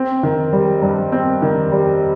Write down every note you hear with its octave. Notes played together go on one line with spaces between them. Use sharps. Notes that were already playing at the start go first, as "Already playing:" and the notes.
Already playing: C4
D#3
G3
G2
C4
D#3
G3